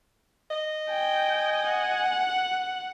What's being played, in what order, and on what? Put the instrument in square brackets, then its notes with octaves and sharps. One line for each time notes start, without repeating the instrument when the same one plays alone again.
[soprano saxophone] D#5
[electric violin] G5 [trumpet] G#5
[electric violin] F#5